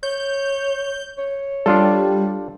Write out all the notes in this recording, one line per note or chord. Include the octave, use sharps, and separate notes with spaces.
C#5 G6
C#5
G3 D4 F4 A4